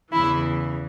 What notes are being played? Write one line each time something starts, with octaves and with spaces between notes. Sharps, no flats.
E2 C#3 E3 E4